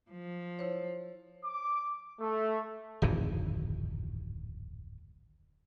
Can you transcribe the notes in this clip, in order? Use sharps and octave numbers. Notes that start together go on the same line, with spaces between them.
F3
E4 C5 C#5
D6
A3
D1 G#1 F2 E3